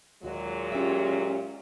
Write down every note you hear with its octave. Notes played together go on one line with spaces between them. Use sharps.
D#2 A#2 F#3 G#3 F#4
C#4 F4 G4 E5